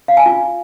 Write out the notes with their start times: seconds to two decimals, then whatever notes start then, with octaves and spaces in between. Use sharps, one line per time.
0.08 F5
0.17 G#5
0.26 F4